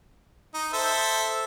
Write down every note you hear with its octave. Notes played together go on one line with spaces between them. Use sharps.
D#4
A4 C5 E5